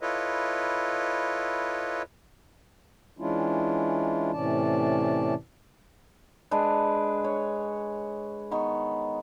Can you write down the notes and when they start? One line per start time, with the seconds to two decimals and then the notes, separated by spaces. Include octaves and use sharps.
0.01 E4 F4 A4 B4 C#5 D#5
3.19 E3 G#3 C#4 D4 E4 F4
4.33 A2 C3 E3 C#4 D5 A5
6.51 G#3 D4 B4
7.24 C#5
8.51 D#3 B3 C#6